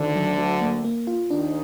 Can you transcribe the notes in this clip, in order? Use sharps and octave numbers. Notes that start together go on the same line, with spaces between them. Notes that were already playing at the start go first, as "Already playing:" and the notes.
Already playing: D2 D3 D#3
F#3
F#3
A#3
A#3
F4
D#2 D#3 D4